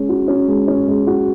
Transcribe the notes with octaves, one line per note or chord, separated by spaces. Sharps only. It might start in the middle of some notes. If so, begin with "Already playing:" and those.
Already playing: G#3 C#4
F#4
C#4
G#3
C#4
G#3
F#4